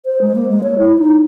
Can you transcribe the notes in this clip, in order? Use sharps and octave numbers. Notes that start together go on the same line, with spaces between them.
C5
G#3
A#3
G#3
C#5
E4
D#4